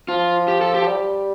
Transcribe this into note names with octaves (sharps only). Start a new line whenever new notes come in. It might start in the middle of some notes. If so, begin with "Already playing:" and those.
F3 F4
G4
A4
G4
F3
G3